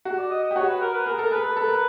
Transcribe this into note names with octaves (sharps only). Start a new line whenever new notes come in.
F#4
D5
D#5
D#5
G4
F#4 C#5
B4
A#4
B4
G#4 A#4
A4
A#4
G#4 B4
A4
A4
A#4